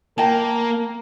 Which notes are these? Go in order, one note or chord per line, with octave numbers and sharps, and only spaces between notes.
A#3 A#4 G5 A5